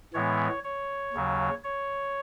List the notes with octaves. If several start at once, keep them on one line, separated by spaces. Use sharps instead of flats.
A2 E3 G#3 B3 C#5
C#5
D#2 C#3 F#3
C#5